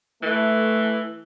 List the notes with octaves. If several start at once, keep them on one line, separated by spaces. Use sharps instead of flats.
E3 A3